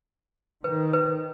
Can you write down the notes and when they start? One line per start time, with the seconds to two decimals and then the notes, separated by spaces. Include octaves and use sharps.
0.64 D#3 B4
0.93 B4